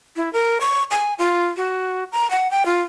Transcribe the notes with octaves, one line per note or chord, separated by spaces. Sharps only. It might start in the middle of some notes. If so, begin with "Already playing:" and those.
E4
A#4
C#6
G#5
F4
F#4
A#5
F#5
G5
F4